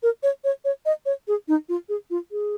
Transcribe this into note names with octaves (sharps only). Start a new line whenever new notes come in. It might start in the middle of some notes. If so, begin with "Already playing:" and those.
A#4
C#5
C#5
C#5
D#5
C#5
G#4
D#4
F4
G#4
F4
G#4